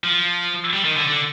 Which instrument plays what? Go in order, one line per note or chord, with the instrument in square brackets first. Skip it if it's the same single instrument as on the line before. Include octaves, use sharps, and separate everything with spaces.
[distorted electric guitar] F3
G3
D#3
D3
D3